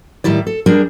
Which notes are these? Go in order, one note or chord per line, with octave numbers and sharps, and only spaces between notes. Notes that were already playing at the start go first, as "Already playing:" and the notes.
A2 D#3 G3 E4 D5
A4
G3 D4 G#4 A#4